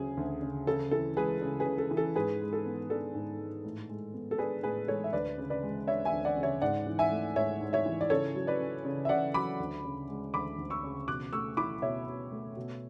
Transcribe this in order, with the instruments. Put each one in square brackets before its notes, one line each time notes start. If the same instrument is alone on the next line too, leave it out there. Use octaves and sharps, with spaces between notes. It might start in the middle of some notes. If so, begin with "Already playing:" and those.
Already playing: [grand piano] D2 C#3 F#3 C#4 G#4
D2
C#3
C#3 A4
E3 A4
G#3 G#4 B4
C#3
G#4 B4
C#3
A4
E3
A4
G#2 G#4 B4
G#3
A4
B3
D4 A4
G#2
G#3
A2
G#3
B3
A4
D4 G#4 B4
A2 G#4 B4
G#3 A4 C#5
E5
D2 B4 D5
C#3
B4 D5
G#3
D4 C#5 E5
E5 G#5
D2
D5 F#5
C#3
C#5 E5
G#2 D5 F#5
E3
E5 G#5
A3
G#2 C#5 E5
G#2
C#5 E5
E3
D5
C#3 A4 C#5
F#3
B4 D5
C#4
C#3
E5
C#3 D5 F#5
F#3 B5 D6
D2
C#3
G#3
D2 B5 D6
D2
C#6 E6
C#3
B2 D6 F#6
A3 C#6 E6
E4 B5 D6
B2 C#5 E5
B2
A3
B2